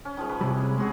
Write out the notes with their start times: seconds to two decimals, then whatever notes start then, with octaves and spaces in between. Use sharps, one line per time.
0.05 C#4
0.17 D#3 F3 G#3
0.29 B4
0.41 C3 G3 E4 G#4
0.78 G#3 C#4 F#4 G#4